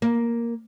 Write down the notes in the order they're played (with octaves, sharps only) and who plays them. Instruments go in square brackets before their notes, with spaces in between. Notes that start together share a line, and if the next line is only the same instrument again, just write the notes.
[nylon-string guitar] A#3